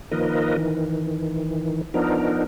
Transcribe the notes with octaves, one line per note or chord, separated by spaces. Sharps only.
D#3 F3 A#3 A#4 B4 D#5
D#3 E3
F3 B3 D4 D#4 A#4